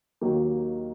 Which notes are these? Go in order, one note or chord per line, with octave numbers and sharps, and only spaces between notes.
D#2 D#3 F#3 A#3